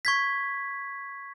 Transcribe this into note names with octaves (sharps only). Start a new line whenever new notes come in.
C#6 G#6 B6